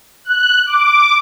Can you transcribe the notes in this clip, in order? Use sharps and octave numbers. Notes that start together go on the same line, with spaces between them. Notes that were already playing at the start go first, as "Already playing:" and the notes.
F#6
D6